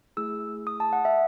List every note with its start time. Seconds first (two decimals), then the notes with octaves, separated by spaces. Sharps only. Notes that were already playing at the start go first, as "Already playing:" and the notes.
0.17 A3 E4 G#4 E6
0.67 D#6
0.80 A5
0.93 F#5
1.05 E5